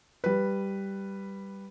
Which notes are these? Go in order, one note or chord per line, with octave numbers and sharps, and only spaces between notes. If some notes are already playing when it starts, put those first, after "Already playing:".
G3 B4